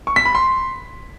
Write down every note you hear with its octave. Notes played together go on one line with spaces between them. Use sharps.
C#6
B6
B5
C6